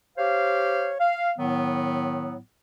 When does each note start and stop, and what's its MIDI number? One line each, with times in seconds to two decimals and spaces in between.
0.18 0.94 67
0.18 0.94 72
0.18 0.94 73
0.18 0.94 77
1.00 1.32 77
1.38 2.37 45
1.38 2.37 51
1.38 2.37 54
1.38 2.37 59